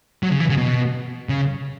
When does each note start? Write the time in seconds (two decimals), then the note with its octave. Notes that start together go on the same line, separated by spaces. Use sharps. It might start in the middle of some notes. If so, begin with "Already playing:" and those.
0.23 F#3
0.32 C#3
0.40 E3
0.49 C#3
0.58 B2
1.29 C#3